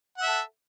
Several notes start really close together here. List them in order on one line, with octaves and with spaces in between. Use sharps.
F#5 E5 A4